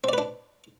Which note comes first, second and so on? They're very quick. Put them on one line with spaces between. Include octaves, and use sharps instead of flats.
C4 D5 B4 D4